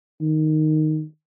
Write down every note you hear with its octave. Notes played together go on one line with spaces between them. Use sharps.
D#3